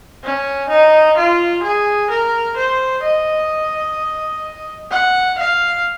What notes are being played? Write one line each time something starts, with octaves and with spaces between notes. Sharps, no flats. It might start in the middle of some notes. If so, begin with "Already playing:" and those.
C#4
D#4
F4
G#4
A#4
C5
D#5
F#5
F5